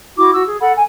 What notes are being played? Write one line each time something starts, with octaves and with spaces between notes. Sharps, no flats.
E4 F#4 D6
F#4 E6
G#4
A4 F#5 B5
G#5